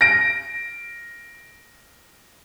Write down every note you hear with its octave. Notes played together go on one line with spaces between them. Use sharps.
A#6 D7